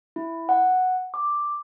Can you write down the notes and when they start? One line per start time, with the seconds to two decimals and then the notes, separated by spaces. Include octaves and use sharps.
0.16 E4
0.49 F#5
1.14 D6